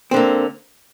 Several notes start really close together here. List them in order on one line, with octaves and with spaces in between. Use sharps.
C4 D3 A#3